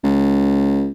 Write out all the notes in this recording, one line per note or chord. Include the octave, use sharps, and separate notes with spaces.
C#2